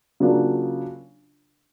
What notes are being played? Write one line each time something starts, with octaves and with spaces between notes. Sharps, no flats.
C#3 F#3 A#3 D4 F4